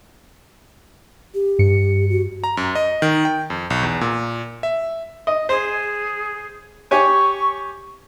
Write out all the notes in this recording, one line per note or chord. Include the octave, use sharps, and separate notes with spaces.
G4
G2 C#7
F#4
A#5
F#2
D#5
D#3
G5
F2
B1
E2
A#2
E5
D#5
G#4 C5
G4 C#5 G#5 C#6